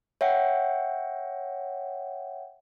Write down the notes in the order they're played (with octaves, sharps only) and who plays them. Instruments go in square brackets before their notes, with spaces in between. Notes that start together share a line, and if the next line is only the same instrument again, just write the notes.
[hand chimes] C#5 E5 F#5 G5